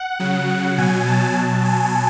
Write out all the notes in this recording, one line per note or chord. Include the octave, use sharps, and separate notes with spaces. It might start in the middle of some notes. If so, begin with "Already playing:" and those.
Already playing: F#5
C#3 F#3
B2 F#3 G#5
A5
B2 F#3 A5
G#5